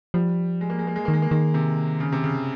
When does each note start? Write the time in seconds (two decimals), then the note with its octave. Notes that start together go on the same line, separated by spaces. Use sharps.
0.14 F3 G3
0.61 G#3
0.70 A#3
0.79 G#3
0.87 A#3
0.96 G#3
1.05 D#3 A#3
1.14 G#3
1.22 A#3
1.31 D#3 G#3
1.54 C3
2.00 C#3
2.12 C3
2.24 C#3